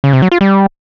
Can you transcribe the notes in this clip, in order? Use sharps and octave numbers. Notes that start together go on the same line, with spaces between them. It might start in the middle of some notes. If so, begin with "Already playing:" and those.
C#3
C3
F#3
F4
G3